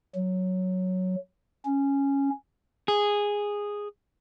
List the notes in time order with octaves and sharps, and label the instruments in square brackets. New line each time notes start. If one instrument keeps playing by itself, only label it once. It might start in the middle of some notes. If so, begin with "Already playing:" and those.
[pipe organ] F#3
C#4
[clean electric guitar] G#4